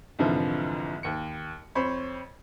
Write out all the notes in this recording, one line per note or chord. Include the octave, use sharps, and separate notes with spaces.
C2 F2 G#2 D3 E3 F3
D#2 C#7
F2 C5 C#5 B5